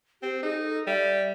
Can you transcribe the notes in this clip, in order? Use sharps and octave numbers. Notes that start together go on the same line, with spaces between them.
C4 G4
D#4 G#4
A4
G3 E5